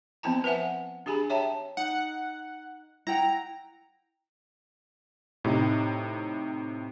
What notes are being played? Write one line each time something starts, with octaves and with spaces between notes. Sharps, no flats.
F3 B3 C4 E4 A5 A#5
B4 C5 E5 F#5 G#5
D4 G4 G#4 G#5 B5
C#5 E5 G5 A5 A#5
D#4 F#5
E4 F#5 G5 A#5
A2 C3 D#4